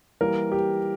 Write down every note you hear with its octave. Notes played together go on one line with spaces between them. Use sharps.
E3 G3 A#3 A#4
G4